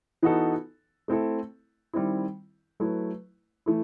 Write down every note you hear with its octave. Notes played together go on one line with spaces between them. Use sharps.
E3 B3 D#4 F#4 A4
A3 C4 E4 A4
D#3 G3 C4 E4
F#3 A3 E4 B4
E3 A3 E4